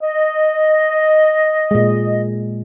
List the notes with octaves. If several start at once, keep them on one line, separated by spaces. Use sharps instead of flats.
D#5
A#2 G#3